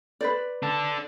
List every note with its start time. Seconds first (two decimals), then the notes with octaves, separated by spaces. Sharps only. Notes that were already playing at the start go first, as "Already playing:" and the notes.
0.21 B4 C5 D5
0.63 D4 A4